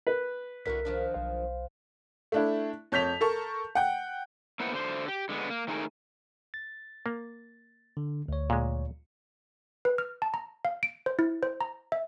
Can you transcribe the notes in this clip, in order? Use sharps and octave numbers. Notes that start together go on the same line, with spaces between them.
B4
C2 D3 E4 F#4 A#4 B6
D#3 F3 D4
B1 C5 F5
A3 D4 E4
F2 C#5 G6 B6 F7
A4 A#4 A5 C#6
F#5 G5
A#3 B3 E4 B4 C5 F#5
D3 C5
G4
D3 G#3 A#3 B3
A#3
D#3 A3 D#4 E4 G#4 A#4
A6
A#3
D3
D2 C#5
A#2 G#3
B4
F6
A5
A#5
F5
D7
C5
E4
C5
A#5
E5